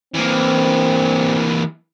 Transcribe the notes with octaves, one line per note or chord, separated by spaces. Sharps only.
E3 A#3 C4